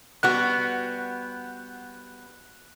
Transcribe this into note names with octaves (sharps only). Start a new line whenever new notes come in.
G3 B3 F#4 F#6